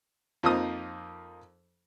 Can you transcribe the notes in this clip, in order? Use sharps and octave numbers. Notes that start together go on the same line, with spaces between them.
F2 F3 A#3 D#4 A5 D#6